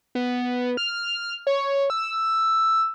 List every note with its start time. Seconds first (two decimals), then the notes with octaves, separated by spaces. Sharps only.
0.15 B3
0.77 F6
1.47 C#5
1.90 E6